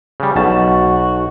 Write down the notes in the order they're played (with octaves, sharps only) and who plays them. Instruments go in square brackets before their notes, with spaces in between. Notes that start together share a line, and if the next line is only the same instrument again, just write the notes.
[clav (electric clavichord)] C#3 G3
[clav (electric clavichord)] B1 A5 [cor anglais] F#4